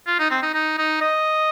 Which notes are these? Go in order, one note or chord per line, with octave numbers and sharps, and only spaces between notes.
F4
D#4
C4
D#4
D#4
D#4
D#5